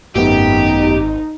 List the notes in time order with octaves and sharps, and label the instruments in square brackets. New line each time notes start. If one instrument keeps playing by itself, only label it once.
[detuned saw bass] G#1 [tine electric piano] F#2 A3 B3 [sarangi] D#4 [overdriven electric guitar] G4